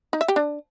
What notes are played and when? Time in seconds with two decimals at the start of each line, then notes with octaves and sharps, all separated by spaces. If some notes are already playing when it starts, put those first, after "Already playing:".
0.13 D#4
0.21 E5
0.28 G4
0.36 D4